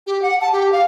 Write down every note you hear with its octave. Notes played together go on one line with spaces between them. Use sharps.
G4
F#5
A5
G4
F5